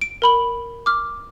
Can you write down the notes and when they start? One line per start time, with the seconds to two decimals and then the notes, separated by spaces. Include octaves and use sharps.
0.01 D7
0.22 A#4 B5 F#7
0.86 D6 F6